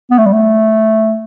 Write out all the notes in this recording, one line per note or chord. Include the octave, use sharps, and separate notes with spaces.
B3
A3
G3
A3